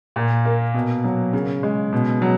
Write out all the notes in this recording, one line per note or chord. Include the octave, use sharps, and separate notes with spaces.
A#2
A#3
B2
F#3
C#3
G#3
B2
F#3